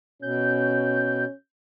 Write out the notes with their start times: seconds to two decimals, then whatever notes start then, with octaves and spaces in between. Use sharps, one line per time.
0.22 B2 C#4 G6